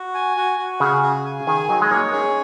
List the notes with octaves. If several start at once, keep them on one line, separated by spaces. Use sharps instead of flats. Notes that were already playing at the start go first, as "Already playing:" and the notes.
Already playing: F#4
G#5
F#4
F#4
C#3 G#4
G#4
G#5
D#3 G#4
F#3 D#4
G#3
A#3 C#5
C#4 G#4